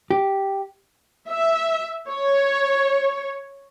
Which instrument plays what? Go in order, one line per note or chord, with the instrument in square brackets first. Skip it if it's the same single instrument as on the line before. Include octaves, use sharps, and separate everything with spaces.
[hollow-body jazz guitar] G4
[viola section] E5
C#5